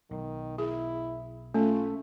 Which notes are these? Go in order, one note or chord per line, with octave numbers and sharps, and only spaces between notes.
B1 D#3
E4 G#4
A3 C#4 F4